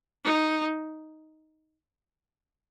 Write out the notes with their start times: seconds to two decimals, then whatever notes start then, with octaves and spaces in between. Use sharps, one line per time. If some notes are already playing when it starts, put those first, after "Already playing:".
0.24 D#4